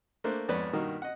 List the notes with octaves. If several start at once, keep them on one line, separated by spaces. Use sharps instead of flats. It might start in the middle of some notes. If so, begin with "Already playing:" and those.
A3 A#3 D4 C5 F#6
F2 G#2 B3 B4 C#5 D5
G2 B2 D#3 A#3 D#4 F#4
D#5 F#5